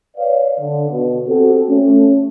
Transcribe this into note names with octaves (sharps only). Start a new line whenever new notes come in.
B4 C#5 D5 F5
D3
B2
C4 F#4 G4 A4
A3 C#4